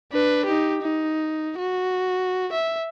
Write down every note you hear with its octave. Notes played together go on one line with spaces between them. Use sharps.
D4 B4
D#4 G4
D#4
F#4
E5